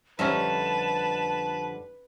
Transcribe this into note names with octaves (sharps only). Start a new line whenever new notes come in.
F2 D3 G3 C#4 A#4 B4 E5 A5